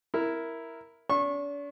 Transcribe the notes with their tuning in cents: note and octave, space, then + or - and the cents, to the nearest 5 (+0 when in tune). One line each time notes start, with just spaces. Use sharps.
E4 +0 A#4 +0
D4 -45 C#6 -25